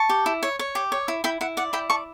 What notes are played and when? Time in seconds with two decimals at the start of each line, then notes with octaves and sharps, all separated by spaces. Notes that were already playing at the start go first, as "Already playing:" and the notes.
Already playing: A5 C#6
0.09 G4
0.26 E4
0.43 C#5
0.59 C#5
0.75 G4
0.92 C#5
1.08 E4
1.24 E4 G5 B5
1.41 E4 F#5
1.57 D5 F#5
1.73 E4 G5 B5
1.90 D5 A5 C#6